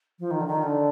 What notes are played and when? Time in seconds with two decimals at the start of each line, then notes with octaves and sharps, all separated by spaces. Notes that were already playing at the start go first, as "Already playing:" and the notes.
0.19 F3
0.31 D#3
0.41 D3
0.46 D#3
0.63 D3